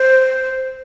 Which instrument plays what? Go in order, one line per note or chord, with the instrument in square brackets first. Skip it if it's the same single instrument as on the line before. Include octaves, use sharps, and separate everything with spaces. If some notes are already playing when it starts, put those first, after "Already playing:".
Already playing: [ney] C5